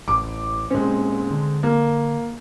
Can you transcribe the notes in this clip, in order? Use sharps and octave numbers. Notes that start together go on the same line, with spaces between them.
A1 D6
A#2 G#3 C4 C#4
D3
A#3